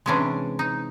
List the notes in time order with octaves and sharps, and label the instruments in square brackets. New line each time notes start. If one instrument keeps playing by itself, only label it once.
[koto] C3 E3 G#3 C#4 D4
D#4